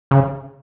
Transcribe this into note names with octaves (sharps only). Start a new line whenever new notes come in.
C#3